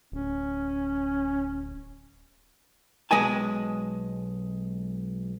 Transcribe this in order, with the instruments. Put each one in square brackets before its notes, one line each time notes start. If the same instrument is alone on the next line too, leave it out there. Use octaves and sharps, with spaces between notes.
[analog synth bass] D1 [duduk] C#4
[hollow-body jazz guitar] B1 E3 G#3 D#5 G#5 A5